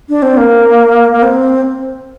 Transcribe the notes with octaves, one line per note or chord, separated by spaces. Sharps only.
D4
C4
A#3
A#3
C4